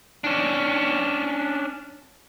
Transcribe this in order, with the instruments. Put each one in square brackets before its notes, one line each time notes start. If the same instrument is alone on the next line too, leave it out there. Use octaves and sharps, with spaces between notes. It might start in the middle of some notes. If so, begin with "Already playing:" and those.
[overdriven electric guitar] C#4 D4